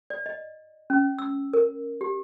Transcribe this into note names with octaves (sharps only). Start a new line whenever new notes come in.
D5
D#5
C#4
E6
A#4
G4